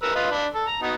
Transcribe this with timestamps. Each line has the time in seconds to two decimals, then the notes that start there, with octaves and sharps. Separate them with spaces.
0.03 A#4 B4 E6
0.15 F4 B4 D#5
0.31 D4 B5
0.54 A4
0.67 A#5
0.82 B3 D#4 F#4